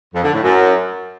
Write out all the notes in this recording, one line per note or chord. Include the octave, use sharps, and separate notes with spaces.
F2
D3
A2
F#2